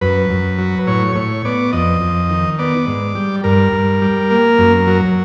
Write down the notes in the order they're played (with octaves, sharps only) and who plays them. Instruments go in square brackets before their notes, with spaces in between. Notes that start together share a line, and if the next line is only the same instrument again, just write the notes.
[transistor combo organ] F#2 B4
F#2
F#3
A2 C#5
A2 C#5
B3 D5
F2 D#5
F2
D#3
B3 D5
G#2
G3
G2 A#4
G2
G3
A#3
F#2
F#3